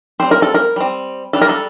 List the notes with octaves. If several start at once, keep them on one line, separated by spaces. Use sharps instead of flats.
G3 C4 C5
A#4
A4
A#4
G3 C4
G3 D4 A4
A#4
A4